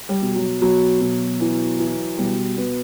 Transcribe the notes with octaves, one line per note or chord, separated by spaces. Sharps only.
G3
B2
F#3
B2 F#3
B2
E3
E3
B2 G3
B2 B3